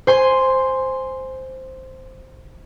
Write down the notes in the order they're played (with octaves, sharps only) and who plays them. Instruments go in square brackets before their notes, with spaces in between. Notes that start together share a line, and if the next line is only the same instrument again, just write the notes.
[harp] C5 G#5 C6